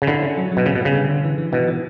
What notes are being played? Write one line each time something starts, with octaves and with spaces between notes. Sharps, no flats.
C#3
D3 E4
C#4
F#3
F#3
B2
C#3 B3
B2
C#3 G3
D3
D3
E3
E3
B2 E3
E3